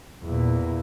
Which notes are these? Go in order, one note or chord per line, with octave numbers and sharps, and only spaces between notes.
E2 A#2